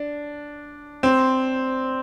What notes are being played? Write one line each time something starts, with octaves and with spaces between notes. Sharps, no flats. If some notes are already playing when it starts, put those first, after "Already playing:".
Already playing: D4
C4